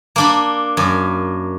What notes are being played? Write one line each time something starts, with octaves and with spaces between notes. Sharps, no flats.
A#3 D4 B5
F#2